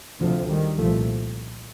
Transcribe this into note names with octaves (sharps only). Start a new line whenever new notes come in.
D2 C3 D3 F3
D#3 G3
C2 A#2 F3 A3